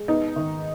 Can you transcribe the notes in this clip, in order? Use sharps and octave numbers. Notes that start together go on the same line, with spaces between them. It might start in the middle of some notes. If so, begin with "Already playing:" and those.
Already playing: G#3
B3 D#4
D#3